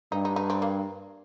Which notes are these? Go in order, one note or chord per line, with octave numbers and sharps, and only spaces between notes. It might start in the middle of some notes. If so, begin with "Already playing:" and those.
G2 D#4
D#4
D#4
C4
A#3